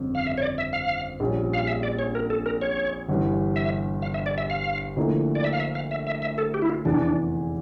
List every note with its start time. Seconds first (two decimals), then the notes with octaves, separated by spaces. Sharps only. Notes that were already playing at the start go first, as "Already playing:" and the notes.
Already playing: G1 F2 C#3
0.15 F5
0.27 E5
0.38 C#5
0.42 D5
0.58 E5
0.73 F5
1.20 A#1 A#2 G3 C#4
1.54 F5
1.68 E5
1.83 D5
1.99 C#5
2.15 A#4
2.30 A4
2.46 A#4
2.62 C#5
3.09 G1 G2 E3
3.56 E5
4.02 F5
4.14 E5
4.26 D5
4.38 E5
4.50 F5
4.96 D2 D3 F3 A#3 E4
5.35 D5
5.44 E5
5.53 F5
5.60 E5
5.75 F5
5.91 E5
6.07 E5
6.22 E5
6.38 A4
6.54 G4
6.62 E4
6.70 F4
6.85 F1 E2 E3 D4